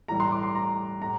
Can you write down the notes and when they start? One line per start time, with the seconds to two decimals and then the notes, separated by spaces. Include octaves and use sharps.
0.08 A2 E3 G3 A#5
0.20 C6
0.32 D6
0.43 C6
0.55 A#5
1.02 A2 A#5